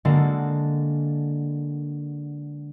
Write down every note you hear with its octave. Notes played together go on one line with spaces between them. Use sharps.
D3 G#3 A#3 F#4 A4 A5